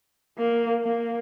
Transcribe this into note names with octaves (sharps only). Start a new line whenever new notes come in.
A#3
A#3